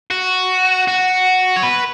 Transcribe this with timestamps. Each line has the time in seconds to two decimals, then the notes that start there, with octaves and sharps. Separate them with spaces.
0.11 F#4
0.88 F#4
1.57 C#5
1.63 B4